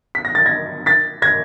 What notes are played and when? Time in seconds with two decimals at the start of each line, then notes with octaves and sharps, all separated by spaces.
0.15 B6
0.25 A#6
0.35 A6
0.46 G#6 A#6
0.86 A6 B6
1.22 G#6 A#6